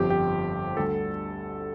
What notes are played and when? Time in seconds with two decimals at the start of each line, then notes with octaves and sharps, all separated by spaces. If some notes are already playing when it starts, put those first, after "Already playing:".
Already playing: G1 F2 F3 G4
0.10 G4
0.77 D2 D3 G3 A4